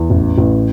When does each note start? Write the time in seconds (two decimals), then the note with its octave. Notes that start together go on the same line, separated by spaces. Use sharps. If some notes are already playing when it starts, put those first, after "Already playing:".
Already playing: E2
0.10 A1
0.38 A1